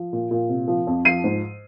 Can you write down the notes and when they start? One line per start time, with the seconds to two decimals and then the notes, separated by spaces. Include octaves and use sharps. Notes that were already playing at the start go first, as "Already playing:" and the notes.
Already playing: F3
0.13 A#2
0.31 A#2
0.49 C3
0.68 F3
0.87 F2
1.05 F3 C7 D#7
1.24 G#2